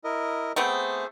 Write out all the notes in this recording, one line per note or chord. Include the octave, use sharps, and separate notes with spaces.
E4 A#4 D#5
A3 B3 C4 G#4 C5